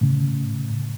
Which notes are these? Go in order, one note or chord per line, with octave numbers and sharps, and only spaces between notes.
A2 C#3